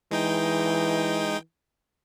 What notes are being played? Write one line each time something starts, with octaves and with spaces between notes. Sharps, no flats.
E3 G#3 D#4 G5